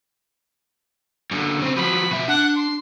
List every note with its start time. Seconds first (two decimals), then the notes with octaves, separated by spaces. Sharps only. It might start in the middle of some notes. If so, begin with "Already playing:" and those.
1.31 F#2 D3
1.59 C#3 C4
1.76 F3 F#3 B5
2.11 B2 E5
2.28 D4 F#5
2.56 C6